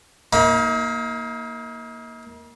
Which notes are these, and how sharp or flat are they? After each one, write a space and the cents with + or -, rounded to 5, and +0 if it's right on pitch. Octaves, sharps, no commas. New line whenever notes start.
A#3 +0 D#4 +45 B5 -30